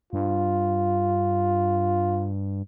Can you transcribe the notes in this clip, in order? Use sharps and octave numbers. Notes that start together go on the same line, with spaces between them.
G2 F4